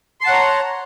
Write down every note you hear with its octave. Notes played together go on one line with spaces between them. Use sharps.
C#5 F#5 A5 A#5 C6